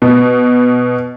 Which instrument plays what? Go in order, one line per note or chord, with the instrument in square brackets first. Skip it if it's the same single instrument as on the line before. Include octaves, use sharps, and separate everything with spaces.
[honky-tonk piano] B2